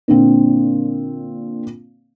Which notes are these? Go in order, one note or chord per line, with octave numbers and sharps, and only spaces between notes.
A#2 D3 C4